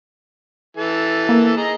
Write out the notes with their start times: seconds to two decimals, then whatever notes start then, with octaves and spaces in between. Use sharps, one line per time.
0.77 E3 A4 A5
1.29 A#3
1.57 G#4 D#5 A#5